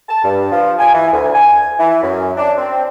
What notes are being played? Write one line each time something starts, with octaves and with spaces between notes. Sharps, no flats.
A5
G2
F3
G#5
E3
D2
G#5
E3
F#2
D4
C4